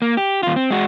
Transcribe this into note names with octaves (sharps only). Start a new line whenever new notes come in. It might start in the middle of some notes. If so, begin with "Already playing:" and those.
A#3
G4
D#2 F4
C4
G#3 F#4